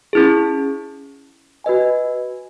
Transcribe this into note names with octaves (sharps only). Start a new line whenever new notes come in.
C#4 E4 G#4
F#4 B4 D#5 G#5